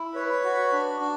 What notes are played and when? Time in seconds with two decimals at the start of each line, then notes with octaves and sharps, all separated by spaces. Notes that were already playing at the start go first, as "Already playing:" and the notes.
Already playing: E4
0.15 B4 C#5
0.44 F#4
0.72 D4
1.00 D4